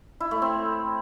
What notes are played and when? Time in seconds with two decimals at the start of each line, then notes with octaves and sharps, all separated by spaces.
0.20 E4
0.31 A3
0.42 C4